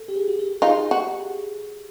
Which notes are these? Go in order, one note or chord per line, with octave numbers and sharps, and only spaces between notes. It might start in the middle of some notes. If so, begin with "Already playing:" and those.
Already playing: A4
G4
G#4
F#4
G4
D#4 F4 G#4
F#4